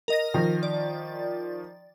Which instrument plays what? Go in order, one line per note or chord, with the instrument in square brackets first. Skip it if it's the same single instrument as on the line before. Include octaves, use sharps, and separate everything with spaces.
[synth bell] A#4 D#5 A#6
[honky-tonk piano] D#3 F3
[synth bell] D5